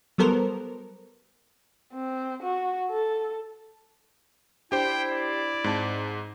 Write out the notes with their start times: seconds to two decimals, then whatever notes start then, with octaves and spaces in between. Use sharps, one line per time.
0.18 F#3 G3 B3 A4 A#4 C5
1.93 C4
2.43 F#4
2.91 A4
4.72 D4 E4 G4 C5 G5
5.13 D5
5.64 G#2 C4 A5